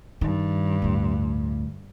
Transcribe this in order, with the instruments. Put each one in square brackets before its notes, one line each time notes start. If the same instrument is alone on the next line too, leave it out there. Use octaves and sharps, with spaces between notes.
[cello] G2 [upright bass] D#3
[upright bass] D2 A2